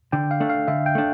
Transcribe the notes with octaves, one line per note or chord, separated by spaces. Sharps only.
D3 G5
F5
A3 D4
F5
D3 E5
G5
A3 D4